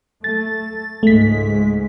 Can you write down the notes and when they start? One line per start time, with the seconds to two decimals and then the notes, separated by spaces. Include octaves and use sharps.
0.24 A3 A6
1.03 C#2 G#2 G#3 A3 B6